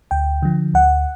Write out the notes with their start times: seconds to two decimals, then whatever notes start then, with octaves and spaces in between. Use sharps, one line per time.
0.11 D2 G5
0.42 D3 F3
0.74 D2 F#5